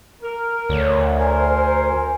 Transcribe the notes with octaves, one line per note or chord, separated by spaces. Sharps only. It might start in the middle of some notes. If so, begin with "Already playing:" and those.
A#4
D2 C#5
A#4 C5 G#5